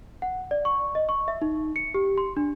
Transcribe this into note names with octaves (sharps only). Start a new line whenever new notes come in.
F#5
D5
C#6
D#5
C#6
E5
D#4
C#7
G4
C6
D4